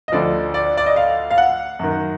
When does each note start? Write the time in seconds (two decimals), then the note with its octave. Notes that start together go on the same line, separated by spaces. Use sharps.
0.08 D#5
0.12 D2 D3 F3 D5
0.54 D5
0.77 D5
0.86 D#5
0.96 F5
1.31 F5
1.38 F#5
1.79 F#2 D#3